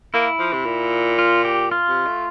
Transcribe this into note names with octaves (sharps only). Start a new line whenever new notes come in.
A#3 E4
F3
C3
A#2
F4
G4
F4
C3
A3